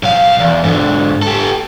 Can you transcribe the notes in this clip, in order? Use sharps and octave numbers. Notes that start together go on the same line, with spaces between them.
B1 F5
E2
G#2 D3
G4 A4